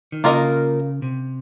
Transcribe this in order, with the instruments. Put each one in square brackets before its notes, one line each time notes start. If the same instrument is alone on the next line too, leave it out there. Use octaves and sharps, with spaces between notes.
[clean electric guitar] D#3
[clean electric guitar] C#3 [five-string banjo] A#3 F4 A#4 D#5
[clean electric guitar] C3